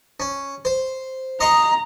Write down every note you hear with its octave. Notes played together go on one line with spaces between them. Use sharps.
C#4
C5
D#5 A#5 C6 C#6